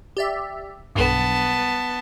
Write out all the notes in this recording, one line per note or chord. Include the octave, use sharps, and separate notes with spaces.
G4 D5 E5
B1 G2 B3 A5